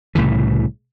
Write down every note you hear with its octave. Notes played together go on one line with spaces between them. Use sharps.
C2 A2 C#3 E3